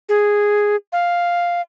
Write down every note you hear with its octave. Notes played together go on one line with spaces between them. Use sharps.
G#4
F5